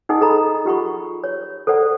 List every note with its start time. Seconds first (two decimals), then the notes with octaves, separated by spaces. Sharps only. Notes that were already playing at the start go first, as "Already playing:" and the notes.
0.09 D#4 G#4 D#5 F#5 G#5 D#6
0.21 G#4 A4 D#5 A#5 B5
0.65 F4 G4 F#5 B5 C#6
1.24 C#5
1.67 A4 C5 D5 F#5